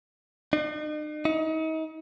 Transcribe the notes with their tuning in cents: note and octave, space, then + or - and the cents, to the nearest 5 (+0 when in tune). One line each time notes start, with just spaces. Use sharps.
D#4 -45
D#4 +35